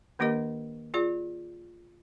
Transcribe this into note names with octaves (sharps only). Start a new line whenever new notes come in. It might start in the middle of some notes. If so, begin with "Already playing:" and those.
D#3 A#3 D4 G4 A#4 D#5
F4 G#4 D5